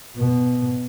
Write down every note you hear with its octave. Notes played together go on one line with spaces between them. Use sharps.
B2